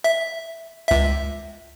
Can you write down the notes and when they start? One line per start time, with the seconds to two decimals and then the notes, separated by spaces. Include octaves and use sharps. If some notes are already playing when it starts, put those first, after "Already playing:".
0.04 E5
0.88 C#2 E5